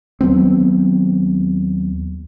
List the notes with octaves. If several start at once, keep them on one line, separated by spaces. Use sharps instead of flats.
D#2 F#3 B3 C4